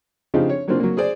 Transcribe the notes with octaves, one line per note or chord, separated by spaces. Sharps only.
C#3 F3 C4 D4 D#4 G4
C#5
F#3 A#3 C4 D4 F4
F#3 A#3
G#4 C5 D5